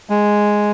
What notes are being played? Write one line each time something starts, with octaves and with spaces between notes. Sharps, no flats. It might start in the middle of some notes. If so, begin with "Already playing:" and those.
G#3